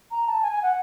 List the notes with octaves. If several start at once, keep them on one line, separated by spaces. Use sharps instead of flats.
A#5
A5
G#5
G#5
F#5